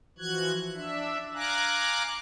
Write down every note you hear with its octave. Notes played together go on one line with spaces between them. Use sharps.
E3 F3 F#4 F#6 G#6
D4 E5
F5 G#5 A#5 D6 F#6